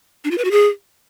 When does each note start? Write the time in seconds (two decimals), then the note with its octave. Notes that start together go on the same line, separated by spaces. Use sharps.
0.24 D4
0.31 F4
0.38 B4
0.45 F#4
0.51 G#4